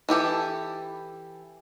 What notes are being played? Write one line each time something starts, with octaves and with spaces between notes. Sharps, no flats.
E3 E4 G4 A4